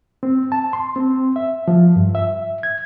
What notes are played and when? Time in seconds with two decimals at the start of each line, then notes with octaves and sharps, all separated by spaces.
0.23 C4
0.52 A5
0.73 C6
0.96 C4
1.36 E5
1.68 F3
1.96 G2
2.15 E5
2.63 G#6